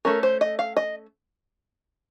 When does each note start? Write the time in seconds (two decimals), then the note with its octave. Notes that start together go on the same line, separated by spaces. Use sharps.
0.05 A3 C#4 A#4
0.23 C5
0.41 D#5
0.59 F5
0.77 D#5